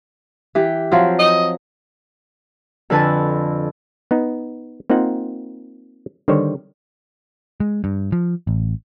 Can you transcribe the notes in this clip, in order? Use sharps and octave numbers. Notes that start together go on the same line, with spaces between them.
E3 G4
F3 F#3 C4
D#5
F2 D3 B4 G#5 A5
B3 D#4
A#3 C4 D#4 F4 F#5
D3 D#3 G3 C5 C#5
G#3
G2
F3
A1